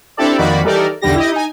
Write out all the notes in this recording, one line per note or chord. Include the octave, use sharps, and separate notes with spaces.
C4 D4 E4 G4 A4 D5
F2 D#3 A#3 F#4 D5 B5
E3 G3 D#4 A4 A#4 D5
B1 E2 D3 G3 G4 A#6
E4 G4 D#5
D#4 G#5